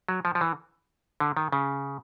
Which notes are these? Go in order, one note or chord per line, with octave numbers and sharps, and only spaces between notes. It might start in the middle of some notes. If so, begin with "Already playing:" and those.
F#3
F3
F3
E3
D3
D#3
C#3